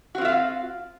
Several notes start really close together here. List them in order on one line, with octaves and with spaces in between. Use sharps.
F#4 C4 F4 E5 F5